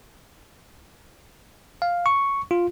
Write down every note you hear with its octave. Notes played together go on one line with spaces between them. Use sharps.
F5
C#6
F4